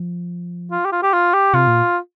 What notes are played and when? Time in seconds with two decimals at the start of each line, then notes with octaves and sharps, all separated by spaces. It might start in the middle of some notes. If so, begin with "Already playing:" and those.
Already playing: F3
0.71 F4
0.85 G4
0.92 F4
1.02 G4
1.13 F4
1.34 G4
1.54 C3 F4
1.67 A#2